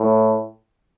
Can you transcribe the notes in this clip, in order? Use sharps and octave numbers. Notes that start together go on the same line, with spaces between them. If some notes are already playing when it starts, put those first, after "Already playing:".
Already playing: A2